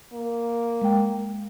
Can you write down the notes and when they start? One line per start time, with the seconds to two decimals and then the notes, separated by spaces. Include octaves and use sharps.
0.13 A#3
0.82 G#3 G5